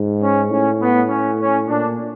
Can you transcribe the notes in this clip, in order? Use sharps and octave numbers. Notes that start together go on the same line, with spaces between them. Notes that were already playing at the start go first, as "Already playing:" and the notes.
Already playing: G#2
C#4
A2 C#4
B3
C#4
C#4
A#2 D4